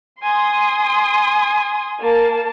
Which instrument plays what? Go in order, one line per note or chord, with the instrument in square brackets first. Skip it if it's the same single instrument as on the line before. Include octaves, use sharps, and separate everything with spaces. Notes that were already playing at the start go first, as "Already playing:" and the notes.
[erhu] G#5 [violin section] C6 D#6
[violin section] A#3 A5